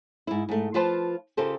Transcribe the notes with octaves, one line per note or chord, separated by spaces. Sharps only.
G#2 E4
G#2 A3
F3 F4 B4 C5 A5
C#3 F4 G4 A4 A#4 C5